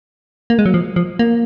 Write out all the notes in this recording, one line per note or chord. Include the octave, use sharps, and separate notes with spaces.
A#3
G#3
F#3
F3
F3
A#3